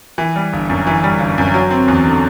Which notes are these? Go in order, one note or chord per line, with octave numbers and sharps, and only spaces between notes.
E3
G3
G1
F#2
E3
G3
G1
F#2
F#3
C4
E2
D3